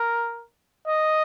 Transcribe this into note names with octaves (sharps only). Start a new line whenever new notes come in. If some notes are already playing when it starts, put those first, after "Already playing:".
Already playing: A#4
D#5